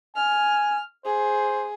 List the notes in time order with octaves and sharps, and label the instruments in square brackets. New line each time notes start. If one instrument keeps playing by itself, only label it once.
[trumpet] G#5 [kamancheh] F6
[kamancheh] G#4 [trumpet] C5